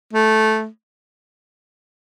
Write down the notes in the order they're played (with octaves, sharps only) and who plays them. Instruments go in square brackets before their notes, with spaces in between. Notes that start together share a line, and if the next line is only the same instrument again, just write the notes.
[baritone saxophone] A3